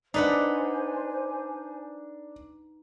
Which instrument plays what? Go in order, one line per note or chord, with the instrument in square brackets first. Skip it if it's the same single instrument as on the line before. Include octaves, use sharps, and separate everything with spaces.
[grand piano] D4 [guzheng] D#4 B4 F#5 [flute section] C5 G#5